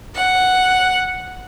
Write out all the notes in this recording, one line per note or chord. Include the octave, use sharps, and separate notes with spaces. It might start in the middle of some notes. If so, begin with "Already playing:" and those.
F#5